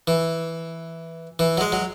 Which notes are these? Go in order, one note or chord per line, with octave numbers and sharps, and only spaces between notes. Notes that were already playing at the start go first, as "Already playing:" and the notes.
E3
E3
F#3
G#3
F#3